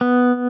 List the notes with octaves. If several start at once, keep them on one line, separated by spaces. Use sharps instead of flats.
B3